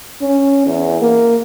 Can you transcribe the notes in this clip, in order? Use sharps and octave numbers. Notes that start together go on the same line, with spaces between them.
C#4
E2
A#3